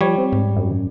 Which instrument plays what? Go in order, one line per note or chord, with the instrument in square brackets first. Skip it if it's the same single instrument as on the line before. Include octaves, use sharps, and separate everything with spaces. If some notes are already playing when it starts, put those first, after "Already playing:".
[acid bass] F3 [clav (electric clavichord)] G3 C#5
[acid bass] C4
[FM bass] G#2
[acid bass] F#2